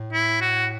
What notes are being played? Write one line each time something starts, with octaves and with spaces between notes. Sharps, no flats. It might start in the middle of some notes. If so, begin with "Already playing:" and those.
Already playing: A2
E4
F#4